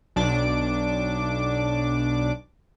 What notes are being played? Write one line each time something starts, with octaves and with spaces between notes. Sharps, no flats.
B1 D4 D6